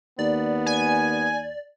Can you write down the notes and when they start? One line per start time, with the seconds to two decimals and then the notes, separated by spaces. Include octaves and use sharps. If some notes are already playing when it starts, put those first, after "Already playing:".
0.19 D#2 B3 D5
0.66 G#5